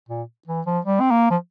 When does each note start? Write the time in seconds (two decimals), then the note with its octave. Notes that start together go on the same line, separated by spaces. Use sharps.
0.09 A#2
0.48 E3
0.66 F3
0.85 G3
1.00 C4
1.11 A#3
1.30 F3